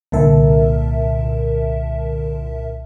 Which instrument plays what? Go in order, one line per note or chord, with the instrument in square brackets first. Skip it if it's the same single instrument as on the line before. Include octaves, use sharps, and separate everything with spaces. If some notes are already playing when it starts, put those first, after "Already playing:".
[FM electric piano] C2 A#2 D3 A#4 E5 A5